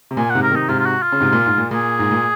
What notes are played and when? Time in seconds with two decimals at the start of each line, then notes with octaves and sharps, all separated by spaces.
0.11 C3
0.17 A#2 G#5
0.30 G#2 C3 F#5
0.43 A#4
0.51 C3 D#3 D#4
0.68 G#2 C3 F4
0.79 F4
0.86 F#4
1.02 F4
1.12 C#3
1.21 G#2 C3
1.32 A#2
1.46 G#2
1.58 A#2
1.71 A#2 G#4
1.99 G#2
2.11 A#2